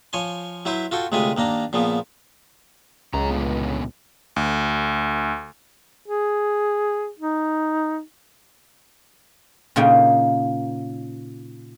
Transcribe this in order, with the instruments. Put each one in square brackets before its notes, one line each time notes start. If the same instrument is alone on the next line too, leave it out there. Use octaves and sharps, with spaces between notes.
[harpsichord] F3 C#5 G#5 C6
F#3 E4 B4 C5
F4 F#4 A4 G5
D2 C3 G#3 F4 B4 G#5
D#2 A#3 D4 A#5
A#2 C#3 F3 B3
[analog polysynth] C#2 [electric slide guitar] F#2 A#5
[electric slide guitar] A#2 D3 B3
[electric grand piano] D2
[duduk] G#4
D#4
[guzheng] A#2 C#3 A#3 D#4 G5